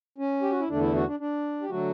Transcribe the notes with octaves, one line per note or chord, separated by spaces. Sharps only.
C#4
G4
F#4
E4
E2 D3 A3 D4
E4
F#4
D4
D4
G4
D3 F#3 A3 F#4